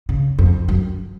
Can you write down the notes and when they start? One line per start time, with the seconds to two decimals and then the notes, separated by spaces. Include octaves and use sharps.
0.09 C#3
0.39 F2
0.68 F#2